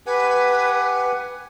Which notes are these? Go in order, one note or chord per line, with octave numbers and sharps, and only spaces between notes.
G4 B4 F#5 G#5